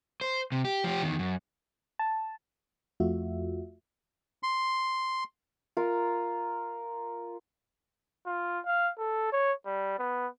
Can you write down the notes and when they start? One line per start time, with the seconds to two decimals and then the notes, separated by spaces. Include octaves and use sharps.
0.21 C5
0.52 C3
0.65 G4
0.84 F3 G4
1.02 E2 D#3
1.19 F#2
1.99 A5
3.00 F2 A3 F4 F#4 E5
4.43 C6
5.77 F4 A#4
8.26 F4
8.66 F5
8.98 A4
9.32 C#5
9.66 G3
9.99 B3